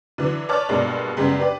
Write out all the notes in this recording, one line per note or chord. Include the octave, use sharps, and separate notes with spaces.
D3 E3 F#3
B4 C#5 D5 A5 D6 F6
G2 B2 G#3 A#3 D4
F#2 C#3 G3 G#3 B3
D4 G4 B4 D5